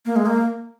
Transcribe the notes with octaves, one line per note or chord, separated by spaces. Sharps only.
A#3
G#3
A#3